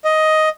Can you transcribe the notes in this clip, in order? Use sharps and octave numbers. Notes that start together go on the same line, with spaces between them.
D#5